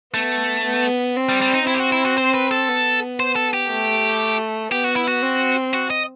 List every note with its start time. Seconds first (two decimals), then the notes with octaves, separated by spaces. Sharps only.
0.14 A3 B3
0.65 B3
1.16 C4
1.29 G3
1.42 G3
1.54 D#4
1.67 C4 E4
1.74 G4
1.79 F#4
1.92 E4
2.05 F#4
2.18 C5
2.34 B4
2.51 A4
2.69 B3
3.20 C5
3.36 A4
3.54 G4
3.70 A3
4.72 B3 G4
4.84 F#4
4.96 E4
5.08 F#4
5.22 C4
5.74 F#4
5.90 D#5